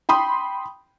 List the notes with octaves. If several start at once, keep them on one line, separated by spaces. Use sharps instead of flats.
G5 B5 C6 D#6